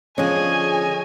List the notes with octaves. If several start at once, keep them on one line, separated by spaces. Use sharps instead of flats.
D3 F3 C#4 G#4 C#5 D#5 G#5